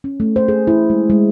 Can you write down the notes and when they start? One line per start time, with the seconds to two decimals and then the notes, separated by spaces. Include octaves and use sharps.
0.04 C#4
0.20 A3
0.36 C5
0.48 G#4
0.67 E4
0.90 G#3
1.10 G#3